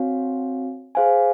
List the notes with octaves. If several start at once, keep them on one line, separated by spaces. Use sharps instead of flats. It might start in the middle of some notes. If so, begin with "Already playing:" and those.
Already playing: C4 F#4 C#5 F5 G#5
G#4 C5 F5 G#5